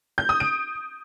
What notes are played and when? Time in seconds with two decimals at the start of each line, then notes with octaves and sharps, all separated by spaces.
0.18 G6
0.29 D#6
0.40 D7